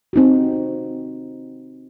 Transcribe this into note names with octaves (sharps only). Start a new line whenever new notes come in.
C4 D#4 F#4